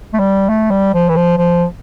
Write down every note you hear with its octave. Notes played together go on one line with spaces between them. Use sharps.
A3
G3
A3
G3
F3
E3
F3
F3